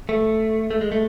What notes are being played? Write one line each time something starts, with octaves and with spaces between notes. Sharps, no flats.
A3
A3
G#3
A3